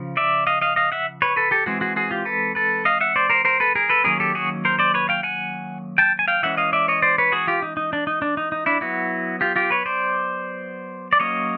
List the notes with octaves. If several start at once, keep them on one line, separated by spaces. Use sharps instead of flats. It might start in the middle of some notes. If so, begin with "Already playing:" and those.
Already playing: C#3 F3
D5 E5
D#5 F5
D#5 F5
D#5 F5
E5 F#5
B4 C#5
A4 B4
G4 A4
E3 G#3 C4 F#4 G#4
F#4 G#4
F#4 G#4
F4 G4
A4 B4
A4 B4
D#5 F5
E5 F#5
C5 D5
A#4 C5
A#4 C5
A4 B4
G#4 A#4
A4 B4
D#3 F#3 A#3 C#4 G#4 A#4
G4 A4
F#4 G#4
A#4 C5
C5 D5
B4 C#5
F5 G5
F#5 G#5
G5 A5
G#5
F5 G5
E3 G#3 C#4 E5 F#5
D#5 F5
D5 E5
C#5 D#5
C5 D5
B4 C#5
F#4 G#4
F4 G4
D#4
D#4
D4
D#4
D4
D#4
D#4
D4 E4
F#3 B3 E4 F#4
F4 G4
F4 G4
B4 C#5
C5 D5
D5
F#3 A#3 C#4 C#5 D#5